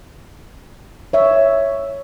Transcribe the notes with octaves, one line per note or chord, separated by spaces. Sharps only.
C#5 E5